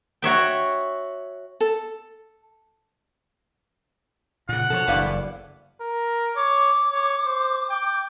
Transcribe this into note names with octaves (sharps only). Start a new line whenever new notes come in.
F#4 C#5 E5 G5
A4
A#2 C#3 F#5
B2 F3 A4 C#5
F#1 G2 E3 B3 D5 F5
A#4
C#5 D6
C#5
C5
G5